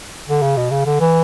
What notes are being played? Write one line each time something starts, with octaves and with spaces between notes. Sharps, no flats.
D3
C#3
B2
C#3
D3
E3